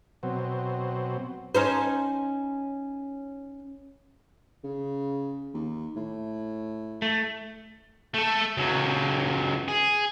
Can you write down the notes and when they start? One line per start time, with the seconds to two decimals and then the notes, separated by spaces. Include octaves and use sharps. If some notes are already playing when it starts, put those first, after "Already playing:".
0.23 B2 F#3 C4
1.55 C#4 D#4 C5
4.64 C#3
5.54 D#2
5.96 A2
7.02 A3
8.14 A3 A4
8.57 C#2 F#3
9.68 G#4